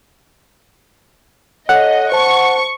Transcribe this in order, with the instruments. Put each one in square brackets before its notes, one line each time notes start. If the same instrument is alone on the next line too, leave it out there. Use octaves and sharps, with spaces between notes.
[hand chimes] A4 C#5 [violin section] D#5 [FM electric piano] F#5
[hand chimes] C5 A5 [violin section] C#6